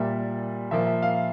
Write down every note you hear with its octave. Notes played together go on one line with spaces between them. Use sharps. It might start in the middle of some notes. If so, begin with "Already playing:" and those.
Already playing: A#2 G3 A#3 E5
A#2 F3 A#3 E5
E5
F5